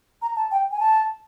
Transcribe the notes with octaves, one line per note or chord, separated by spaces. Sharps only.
A#5
A5
G5
G#5
A5